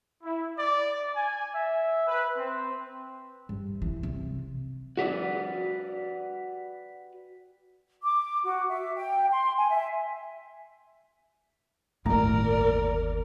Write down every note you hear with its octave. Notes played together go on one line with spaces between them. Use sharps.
E4
D5
G#5
E5
B4
C4
G2
E3
C3
F#4 G4 B4 D5
D6
F#4
E5
G5
C6
G#5
E5
G1 D#2 A2 A#4 D5 A#5